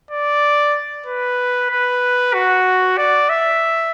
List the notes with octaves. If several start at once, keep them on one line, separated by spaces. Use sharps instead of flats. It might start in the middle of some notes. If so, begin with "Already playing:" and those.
D5
B4
B4
F#4
D5
E5